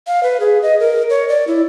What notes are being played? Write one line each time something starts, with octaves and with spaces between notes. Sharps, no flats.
F5
B4
G#4
D#5
A#4
C#5
D5
E4